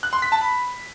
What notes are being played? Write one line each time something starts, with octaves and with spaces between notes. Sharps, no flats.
F#6
C6
B6
A5
B5